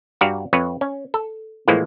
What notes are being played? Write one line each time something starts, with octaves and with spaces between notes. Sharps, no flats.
G2 F#4 D5 F5 A#5
F2 B4 C#5
C#4
A4
A2 E3 F3 G#3 A#3